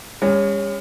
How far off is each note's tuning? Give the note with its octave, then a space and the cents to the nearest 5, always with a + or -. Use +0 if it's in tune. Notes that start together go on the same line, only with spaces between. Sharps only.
G3 +45 C#4 +0